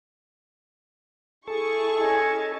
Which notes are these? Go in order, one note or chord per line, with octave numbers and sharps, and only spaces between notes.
E4 G#4 A4 C#6
C#4 D#5 G#5